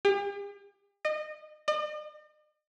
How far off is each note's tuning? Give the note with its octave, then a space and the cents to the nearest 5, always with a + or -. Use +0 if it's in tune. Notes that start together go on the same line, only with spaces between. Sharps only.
G4 +45
D#5 -30
D#5 -45